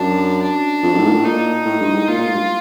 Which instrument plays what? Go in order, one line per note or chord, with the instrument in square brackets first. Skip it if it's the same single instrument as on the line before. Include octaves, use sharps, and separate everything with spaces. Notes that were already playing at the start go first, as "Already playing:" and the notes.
Already playing: [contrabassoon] F#2 [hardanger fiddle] D4
[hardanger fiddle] D4
[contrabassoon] F2
F#2
A2
G#2
A#2
A2
[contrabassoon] A#2 [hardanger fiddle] D#4
[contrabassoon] A2
G2
G#2
[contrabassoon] A#2 [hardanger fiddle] F4
[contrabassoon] A#2
A2
G2